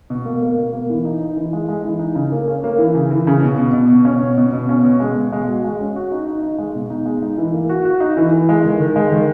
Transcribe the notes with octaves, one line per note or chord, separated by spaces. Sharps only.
B2
A#3
A#3
B2
A#3
E3
D#4
D#4
E3
G#3
G#3
E3
D#4
C#3
A#3
C#4
A#3
E3
C#3
E3
C#3
B2
B2
B2
B2
C#4
B2
B2
B2
C#4
B2
G#3
B2
G#3
F#4
G#3
C#4
F#4
D#4
D#4
D#4
G#3
B2
D#4
G#3
D#4
E3
A#3
F#4
F#4
D#4
E3
E3
G#3
D#3
D#3
G#3
D#3